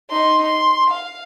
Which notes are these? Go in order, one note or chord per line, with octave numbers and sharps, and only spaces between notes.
D#4 C6
C6
F5